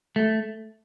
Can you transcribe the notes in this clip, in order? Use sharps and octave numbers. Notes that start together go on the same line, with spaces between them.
A3